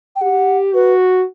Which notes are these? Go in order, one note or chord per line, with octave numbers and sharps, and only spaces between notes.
G5
G4 F#5
F#4 B4